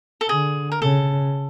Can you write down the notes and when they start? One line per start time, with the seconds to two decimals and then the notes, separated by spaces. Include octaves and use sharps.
0.21 A4
0.29 D3 G#4
0.72 A#4
0.82 C#3 A4